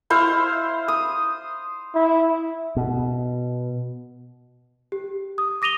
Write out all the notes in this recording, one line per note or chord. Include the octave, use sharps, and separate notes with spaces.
E4 C5 F5
D#6
E4
B2
G4
D#6
D6 A#6 D#7 F7 G7